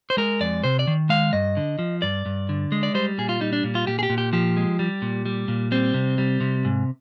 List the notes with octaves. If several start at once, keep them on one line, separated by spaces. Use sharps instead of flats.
C5
G#3 A#4
F2 D5
C3 C5
D5
D#3
G#3 F5
G2 D#5
D3
F3
G2 D5
G2
D3
G#3
D5
G3 C5
A#2 G#4
F4
G3 D#4
D4
A#2
F4
A#2 G4
G#4
G4
A#2
G4
F3 G4
G#3
G3
A#2
G3
A#2
G3 C4
C3
G3
C3
G#2